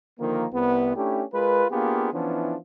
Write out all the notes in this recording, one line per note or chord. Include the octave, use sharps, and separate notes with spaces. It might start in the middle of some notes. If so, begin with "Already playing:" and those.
D3 D#3 F3 A#3
C2 B3
A3 C#4 D4 E4 G4
G#3 F4 A#4 B4
A#3 B3 D4 F4 G4 G#4
E3 F3 B3 C#4 D4 E4